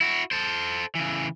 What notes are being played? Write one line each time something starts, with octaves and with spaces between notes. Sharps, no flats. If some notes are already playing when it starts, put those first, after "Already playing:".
E4 F#4
A4 C5
C#3 E3